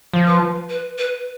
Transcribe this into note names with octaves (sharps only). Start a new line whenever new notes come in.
F3
B4
B4
B4